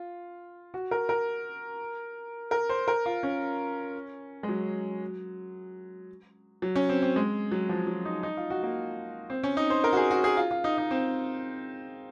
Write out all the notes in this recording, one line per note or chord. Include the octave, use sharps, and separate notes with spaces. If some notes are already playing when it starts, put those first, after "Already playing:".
Already playing: F4
F#4
A#4
A#4
A#4
C5
A#4
F4
C#4
G#3
F#3
F#3
C#4
C4
C4
G#3
F#3
F3
F#3
D#4
D#4
F4
F#4
A#3
C4
C#4
D#4
C5
A#4
F#4
G#4
F#4
G#4
F4
F4
D#4
D#4
C4